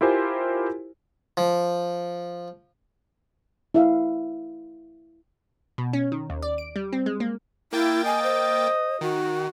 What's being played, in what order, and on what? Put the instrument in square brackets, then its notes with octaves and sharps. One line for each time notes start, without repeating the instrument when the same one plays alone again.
[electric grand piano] E4 F4 G4 A#4 C5 G#5
[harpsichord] F3
[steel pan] E4 E5 F5
[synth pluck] B2
C#4
D#3
D#2
D5
D7
G3
C4
G#3
A#3
[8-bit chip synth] A#3 G5 A6 [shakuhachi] E4
[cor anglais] D#5 [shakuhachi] G#5
[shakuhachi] C5
[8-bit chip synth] D#3 [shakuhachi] F#4